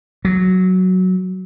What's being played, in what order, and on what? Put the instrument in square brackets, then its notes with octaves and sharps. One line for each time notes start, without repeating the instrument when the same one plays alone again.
[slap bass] F#3